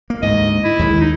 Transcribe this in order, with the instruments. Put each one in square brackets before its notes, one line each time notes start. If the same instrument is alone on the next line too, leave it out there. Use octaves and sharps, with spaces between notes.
[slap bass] A#3
[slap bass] D2 G#2 [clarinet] D#5
[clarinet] E4
[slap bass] D#2 D#3 G#3
[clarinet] D#4